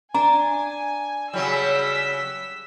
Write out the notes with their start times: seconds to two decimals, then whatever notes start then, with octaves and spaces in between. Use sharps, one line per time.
0.14 D4 G#5 A#5
1.33 C#3 F#3 G3 E6 B6